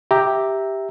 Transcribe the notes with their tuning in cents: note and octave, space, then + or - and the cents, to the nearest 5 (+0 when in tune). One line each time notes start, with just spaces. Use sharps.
G4 +0 E5 -10 A#5 +0